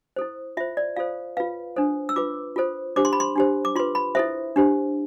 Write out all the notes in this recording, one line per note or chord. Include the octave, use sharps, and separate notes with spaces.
E4 A4 C5
F4 C5 E5
D5
F4 A4 C5 F5
F4 B4 F5
D4 A4 C5
E6
F4 B4 D6
F4 A4 C5
D4 G4 C5 D6
C6
B5
C6
D4 G4 C5
D6
F4 B4 C6
B5
E4 A4 C5 E5
D4 G4 C5